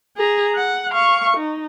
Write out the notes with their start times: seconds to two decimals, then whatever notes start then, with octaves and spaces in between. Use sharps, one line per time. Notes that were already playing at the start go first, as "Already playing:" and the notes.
0.16 G#4 A#5
0.56 F#5
0.92 F5 C#6
1.37 D#4